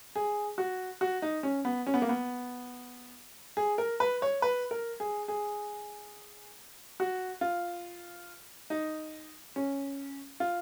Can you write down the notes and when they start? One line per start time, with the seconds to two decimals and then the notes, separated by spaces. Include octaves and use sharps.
0.16 G#4
0.58 F#4
1.01 F#4
1.22 D#4
1.43 C#4
1.65 B3
1.87 C#4
1.94 B3
2.02 A#3
2.09 B3
3.57 G#4
3.78 A#4
4.00 B4
4.22 C#5
4.42 B4
4.71 A#4
5.00 G#4
5.28 G#4
7.00 F#4
7.41 F4
8.70 D#4
9.56 C#4
10.40 F4